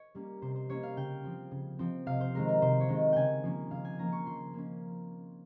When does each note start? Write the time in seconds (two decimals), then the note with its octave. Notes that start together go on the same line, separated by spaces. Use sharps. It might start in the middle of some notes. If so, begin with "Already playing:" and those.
Already playing: C#5
0.15 G3 A#3 C#4
0.42 C3 C5
0.55 C5
0.69 G3 A#3 C#4 C#5
0.83 F5
0.96 C#3 G5
1.24 F3 C4
1.51 C#3
1.79 F3 C4
2.06 C3 F5
2.21 C5
2.35 D#3 G#3 C4 A#4
2.49 A#4
2.62 C3 C5
2.80 C#5
2.89 D#3 G#3 C4
3.12 C#3 G5 G#5
3.43 F3 A#3 C#4
3.71 C#3 F5
3.85 G#5
3.99 F3 A#3 C#4 A#5
4.12 C#6
4.26 F3 C6
4.54 A#3 C#4